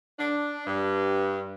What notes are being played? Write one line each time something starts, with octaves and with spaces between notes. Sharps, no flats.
D4
G2